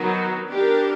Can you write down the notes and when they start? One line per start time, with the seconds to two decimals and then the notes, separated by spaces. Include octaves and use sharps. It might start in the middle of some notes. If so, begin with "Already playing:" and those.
Already playing: D#3 F#3 B3 D#4 F#4
0.49 B3 D4 G4 A#4